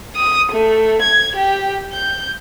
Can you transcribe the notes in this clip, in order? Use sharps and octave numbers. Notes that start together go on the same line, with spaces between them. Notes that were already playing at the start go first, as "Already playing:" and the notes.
D#6
A3
G#6
G4
G6